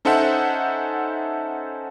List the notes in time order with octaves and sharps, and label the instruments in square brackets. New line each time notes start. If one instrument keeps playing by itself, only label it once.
[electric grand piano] C#4 D#4 A4 C5 E5 F#5